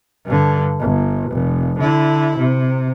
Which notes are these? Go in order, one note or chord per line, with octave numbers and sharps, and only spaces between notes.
G2 D3
G1
F1
D3 E4
C3